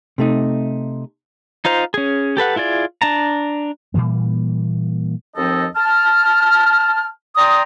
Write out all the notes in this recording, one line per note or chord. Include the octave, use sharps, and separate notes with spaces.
C3 A3 D#4
D#4 F4 C5 A#5
C#4 G#4
G4 A4 B4 F#5
E4 F4 G#4 D5
D4 A5 A#5
A#2 E3 G3 A#3
D#2 F3 C4 A4 D#5
A5 F6
D5 G5 A#5 C6 D#6